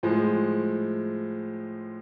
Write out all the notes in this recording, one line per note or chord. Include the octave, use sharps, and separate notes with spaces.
A2 F3 G#3